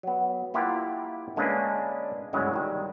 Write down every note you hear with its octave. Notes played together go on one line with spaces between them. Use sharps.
F#3 B3
A#3 E4 F4 G4 F#5 A#5
D3 G#3 A#3 C#4 D4 B4
G1 D2 C#3 F#3 G#3 E4
D#3 G3